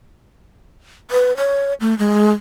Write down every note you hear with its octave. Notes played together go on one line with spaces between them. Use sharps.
B4
C#5
A3
G#3